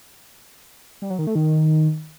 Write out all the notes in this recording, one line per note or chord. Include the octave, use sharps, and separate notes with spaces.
G3
F#3
D#3
A3
D#3